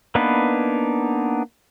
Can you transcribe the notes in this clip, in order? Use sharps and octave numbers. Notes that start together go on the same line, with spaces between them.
A#3 B3 D4 D#4 B4